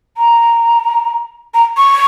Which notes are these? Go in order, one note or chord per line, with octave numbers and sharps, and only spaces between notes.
A#5
A#5
C#6